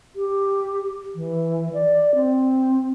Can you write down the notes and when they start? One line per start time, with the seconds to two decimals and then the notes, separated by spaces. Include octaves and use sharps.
0.16 G4
1.16 E3
1.74 D5
2.15 C4